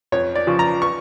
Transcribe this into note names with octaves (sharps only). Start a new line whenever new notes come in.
F2 C#5
D5
C#3 F3
A#5
C#6